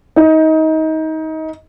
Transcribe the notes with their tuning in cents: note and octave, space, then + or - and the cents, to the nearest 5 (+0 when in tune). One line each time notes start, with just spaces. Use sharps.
D#4 +25